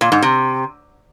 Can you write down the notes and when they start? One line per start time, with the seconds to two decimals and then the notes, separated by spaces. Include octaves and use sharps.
0.01 A#2
0.12 G#2
0.22 C3